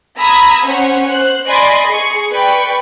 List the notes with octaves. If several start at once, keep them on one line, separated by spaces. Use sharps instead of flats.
A#5 B5 D#6 E6 G#6 B6
C#4 C5 C#5 F#5
C5 F#6
D5 D#5 G#5 B5 C6
G#4 C#6
B4 D5 G5 C#6